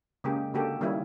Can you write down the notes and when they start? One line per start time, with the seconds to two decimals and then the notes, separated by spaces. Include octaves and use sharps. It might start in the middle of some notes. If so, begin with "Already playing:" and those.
0.24 C#3 G#3 A#3 G4 G#4
0.54 D3 A#3 F#4 G4 A4
0.81 D#3 G3 A#3 C#4 D#4 E4